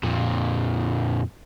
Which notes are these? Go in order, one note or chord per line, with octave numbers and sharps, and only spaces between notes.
F2 A#2